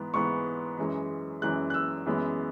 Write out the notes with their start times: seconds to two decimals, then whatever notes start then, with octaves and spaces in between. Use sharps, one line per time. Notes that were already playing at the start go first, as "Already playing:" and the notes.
Already playing: G#2 E3 B3
0.14 G#2 E3 B3 C#6
0.78 F#2 E3 G#3
1.42 F#2 E3 G#3 F#6
1.70 F#6
1.74 E6
2.06 F#2 E3 G#3 B3